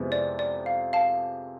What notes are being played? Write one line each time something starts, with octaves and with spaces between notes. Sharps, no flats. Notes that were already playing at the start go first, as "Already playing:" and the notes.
Already playing: F2 C3 G#3 B3 E4
D5
D5
F5
F5 A5